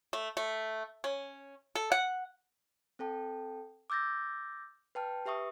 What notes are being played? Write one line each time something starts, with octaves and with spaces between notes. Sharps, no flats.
A3
A3
C#4
A4
F#5
C4 A4 G5 A5
D6 E6 G6 A6 A#6
B4 G5 A5 F6
G4 B4 E5 C#6 D#6